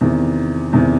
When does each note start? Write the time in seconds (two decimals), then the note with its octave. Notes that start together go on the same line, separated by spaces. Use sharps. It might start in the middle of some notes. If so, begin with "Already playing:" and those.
0.01 E2 C3 D#3
0.73 E2 C3 D#3